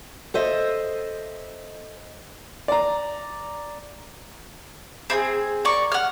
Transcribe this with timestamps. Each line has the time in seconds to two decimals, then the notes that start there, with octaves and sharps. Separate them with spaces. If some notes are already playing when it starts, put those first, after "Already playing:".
0.34 A4 C5 D#5 E5
2.68 D5 A#5
5.10 C4 E4 G#4
5.65 A#4 D5 C#6
5.92 F#5 F6